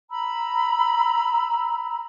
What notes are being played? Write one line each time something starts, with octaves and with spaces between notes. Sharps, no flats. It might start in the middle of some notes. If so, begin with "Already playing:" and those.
A#5 B5 E6